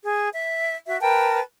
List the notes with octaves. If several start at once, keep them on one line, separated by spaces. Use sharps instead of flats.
G#4
E5
F#4 E5
A#4 B4 G5 A5